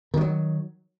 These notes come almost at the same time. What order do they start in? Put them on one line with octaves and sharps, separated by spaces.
D#3 G3 F#3